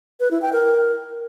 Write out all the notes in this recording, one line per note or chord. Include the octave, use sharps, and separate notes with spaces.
B4
E4
G5
A#4